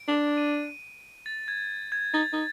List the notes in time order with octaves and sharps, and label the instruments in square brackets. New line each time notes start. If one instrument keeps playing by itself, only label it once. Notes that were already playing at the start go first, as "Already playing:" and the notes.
Already playing: [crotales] D7
[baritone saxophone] D4
[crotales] D#7
A6
G#6
G#6
[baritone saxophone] D#4 [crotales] A6
[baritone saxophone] D#4